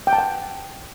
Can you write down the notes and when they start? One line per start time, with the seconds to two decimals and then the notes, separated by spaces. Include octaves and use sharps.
0.07 G5
0.13 A5
0.18 F#5